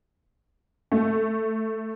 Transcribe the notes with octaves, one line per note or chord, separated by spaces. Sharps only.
A3